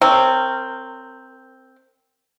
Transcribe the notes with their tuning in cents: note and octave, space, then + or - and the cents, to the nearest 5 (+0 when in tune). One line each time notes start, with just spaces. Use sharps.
C4 +0 A#4 -25 C#5 +0